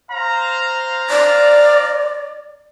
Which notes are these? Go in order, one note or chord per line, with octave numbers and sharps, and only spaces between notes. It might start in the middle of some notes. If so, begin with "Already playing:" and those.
C5 F5 A#5
D5